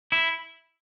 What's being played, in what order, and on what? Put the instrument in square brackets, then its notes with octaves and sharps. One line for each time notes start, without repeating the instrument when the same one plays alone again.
[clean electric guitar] E4